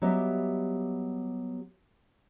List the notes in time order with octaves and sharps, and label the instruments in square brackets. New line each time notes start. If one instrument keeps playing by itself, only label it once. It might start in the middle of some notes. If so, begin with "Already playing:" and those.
[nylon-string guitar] F#3 G3 B3 G4 D#5 E5